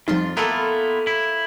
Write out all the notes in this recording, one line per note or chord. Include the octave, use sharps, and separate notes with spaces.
F2 F3 G3 D#4 F4 C6
A#3 B3 E4 F4 A4
E4